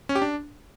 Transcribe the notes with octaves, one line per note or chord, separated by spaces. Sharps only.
C#4
G4
D4